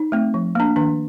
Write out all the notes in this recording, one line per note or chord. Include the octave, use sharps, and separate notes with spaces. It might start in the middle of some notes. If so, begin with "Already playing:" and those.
Already playing: D#4
A3 C4
F3
A#3 D4
D#3 D4